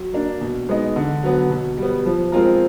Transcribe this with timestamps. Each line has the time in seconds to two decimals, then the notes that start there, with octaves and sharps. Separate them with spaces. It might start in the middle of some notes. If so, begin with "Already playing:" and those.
Already playing: F#3
0.14 A#3 D4
0.41 B2
0.69 G#3 B3 D#4
0.96 D3
1.23 F#3 B3
1.50 B2
1.77 G3
1.82 B3
2.05 F3
2.32 G#3 C4 F4 A#4